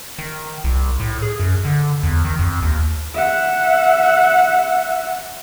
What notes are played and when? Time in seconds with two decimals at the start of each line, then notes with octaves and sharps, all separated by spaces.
0.18 D#3
0.64 C2
1.00 A2
1.22 G#4
1.40 F#2
1.65 D3
2.03 E2
2.25 D#3
2.39 F2
2.62 D#2
3.14 E5 F#5